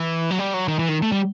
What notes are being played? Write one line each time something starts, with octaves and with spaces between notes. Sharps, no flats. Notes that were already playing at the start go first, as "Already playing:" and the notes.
Already playing: E3
F#3
G3
F#3
D#3
E3
D#3
A3
G3